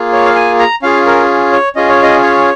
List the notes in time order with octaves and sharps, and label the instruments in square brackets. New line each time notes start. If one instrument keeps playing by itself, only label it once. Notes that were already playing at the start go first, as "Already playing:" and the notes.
Already playing: [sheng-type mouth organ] A#3 F4 G#4
C#5
F5
G#5
A#5
C#4 F4 G#4 F5
A#4
C#5
C#4 F4 G#4 D#5
C#5
D#5
C#5